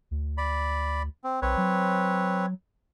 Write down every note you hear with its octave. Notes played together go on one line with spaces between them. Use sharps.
D2
D5 B5
C4
B1 C4 B4 C#5
F#3